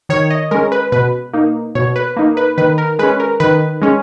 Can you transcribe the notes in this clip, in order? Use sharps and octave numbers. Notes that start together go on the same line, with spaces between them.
D#3 C#5
D#5
G#3 C#4 A#4
B4
B2 B4
A#3 D#4
B2 C#5
B4
A#3 D#4
B4
D#3 B4
A#4
G#3 C#4 B4
A#4
D#3 B4
G#3 C#4